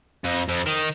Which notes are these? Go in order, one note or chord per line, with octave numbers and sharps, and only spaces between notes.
F2
F2
D#3